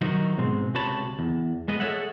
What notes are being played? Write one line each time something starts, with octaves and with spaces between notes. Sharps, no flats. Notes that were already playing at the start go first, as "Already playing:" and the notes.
D#3 F3 F#3 D#4 F#4
G#2 B2 G#3 C4
C#2 C3 F#4 C#5 A5 B5
E2
G#3 B3 D#5
G#4 A4 B4 C#5 E5 F#5